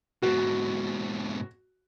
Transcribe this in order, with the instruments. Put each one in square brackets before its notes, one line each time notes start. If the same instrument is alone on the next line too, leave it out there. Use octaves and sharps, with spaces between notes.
[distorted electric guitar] G#2 B2 [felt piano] F#4